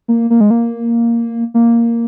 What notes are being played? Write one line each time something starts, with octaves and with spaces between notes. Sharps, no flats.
A#3
A#3
G#3
A#3
A#3